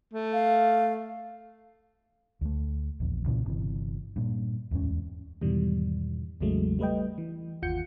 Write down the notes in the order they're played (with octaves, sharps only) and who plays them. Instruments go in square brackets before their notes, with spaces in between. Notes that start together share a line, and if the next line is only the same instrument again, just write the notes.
[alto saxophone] A3
[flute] F5
[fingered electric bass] D2 A3
D#1 A#1 E2
C2 A#2 C#3 E3
G1 C3 E3
G2 A#2
D1 E2 G#2 C#4
[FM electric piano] E2 G#2 B2 D#3 E3 G3
A1 E2 C#3 F#3 G#3 A3
G3 A3 B4 D#5 G5
E3
G1 D#2 F4 F#5 G6 C#7